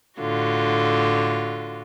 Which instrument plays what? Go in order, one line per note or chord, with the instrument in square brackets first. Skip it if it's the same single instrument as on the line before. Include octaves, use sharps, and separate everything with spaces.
[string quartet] A2 D3 F4 F#4